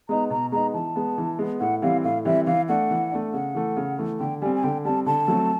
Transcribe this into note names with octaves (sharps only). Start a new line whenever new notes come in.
G#3 B3 D#4 A#5
B2 A#5
G#3 B3 D#4 A#5
E3 A5
G#3 B3
E3
G#3 B3
A2 F#5
E3 G3 C4 F5
A2 F5
E3 G3 C4 E5
E3 F5
A3 D4 F#5
E3
A3 D4
C#3 F#5
E3 A3
C#3
E3 A3
D3 G5
G3 C4 G#5
G#5
D3 G5
G3 C4 A5
D3 A5
F#3 A3 C4